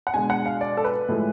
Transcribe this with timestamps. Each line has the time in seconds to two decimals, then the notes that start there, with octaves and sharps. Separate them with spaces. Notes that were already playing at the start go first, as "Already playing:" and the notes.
0.07 F#5
0.14 B2 G#3 D4 G#5
0.30 F#5
0.46 F5
0.61 D5
0.77 A4
0.84 B4
1.09 A2 F3 G#3